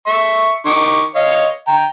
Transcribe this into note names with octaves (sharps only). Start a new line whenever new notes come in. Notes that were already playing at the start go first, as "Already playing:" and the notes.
E5 C#6
D#3 C#6 D6
C#5 D#5 F5
G5 A#5